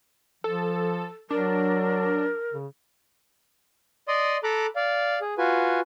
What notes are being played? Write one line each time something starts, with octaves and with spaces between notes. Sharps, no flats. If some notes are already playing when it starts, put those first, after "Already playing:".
F3 A4
F#3 D4 A#4
C#3
D5 D#5 C6 D#6
A4 A#5 B5 D6 F#6
D5 F5
G#4
F4 F#4 B4 G#5